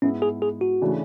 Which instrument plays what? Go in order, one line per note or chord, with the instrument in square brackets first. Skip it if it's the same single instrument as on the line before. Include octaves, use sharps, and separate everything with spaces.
[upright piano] G#2 G#3 B3 E4 [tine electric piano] C#4
[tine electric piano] G#4
G#4
F#4
[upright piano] C#3 E3 A3 D4